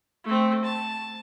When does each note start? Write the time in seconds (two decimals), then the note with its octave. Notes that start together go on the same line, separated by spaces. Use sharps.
0.24 A3 C4
0.65 A5